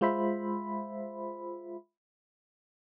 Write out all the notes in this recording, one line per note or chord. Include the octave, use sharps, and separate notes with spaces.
G#3 F4 C5 E5 B5